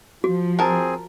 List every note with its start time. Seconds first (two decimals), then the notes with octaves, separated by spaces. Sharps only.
0.24 F3 F#4
0.59 C4 G#4 A#4 A5